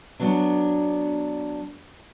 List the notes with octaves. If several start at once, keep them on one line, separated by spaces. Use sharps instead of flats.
F#3 B3 D4